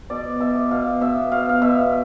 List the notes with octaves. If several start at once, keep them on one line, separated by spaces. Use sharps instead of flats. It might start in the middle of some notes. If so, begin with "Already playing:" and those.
B2 D5
B2 E5
B2 F5
B2 E5
B2 F5
F5
B2 E5